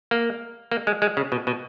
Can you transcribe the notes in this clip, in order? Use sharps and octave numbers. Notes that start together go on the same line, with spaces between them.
A#3
A#3
G#3
G#3
C#3
B2
B2